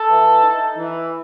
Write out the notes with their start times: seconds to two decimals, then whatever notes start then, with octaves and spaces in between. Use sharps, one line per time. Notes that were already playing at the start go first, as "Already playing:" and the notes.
Already playing: A4
0.09 E3
0.43 D#4
0.77 E3